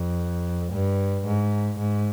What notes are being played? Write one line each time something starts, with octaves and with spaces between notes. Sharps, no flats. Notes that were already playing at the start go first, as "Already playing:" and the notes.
Already playing: F2
G2
G#2
G#2